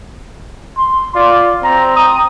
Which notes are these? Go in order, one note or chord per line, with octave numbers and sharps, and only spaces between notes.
C6
F4 D5
C4 A#5
A#5 D#6